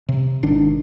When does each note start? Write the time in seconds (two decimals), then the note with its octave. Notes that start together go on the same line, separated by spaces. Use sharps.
0.09 C3
0.43 G#1 D#3 D4